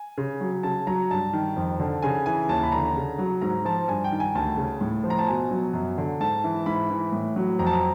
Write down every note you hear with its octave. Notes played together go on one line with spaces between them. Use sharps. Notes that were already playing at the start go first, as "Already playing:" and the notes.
Already playing: G#5
C#3
F#3
C#3 A5
F#3 A#5
G2 A5
D#3
F2
D3
C#3 G#5
E3 G#5
D#2 A5
B5
D3 A#5
C#3
F#3
G#2 A#5
F3 A5
G2 G#5
G5
D#3
G#5
D2 A5
C#3
A2
F3
A#5
A5
B2 G#5
F#3
F#2
D3
G#2 A5
E3
G#2 B5
E3
A2
F#3
F2 A#5
A5
A#5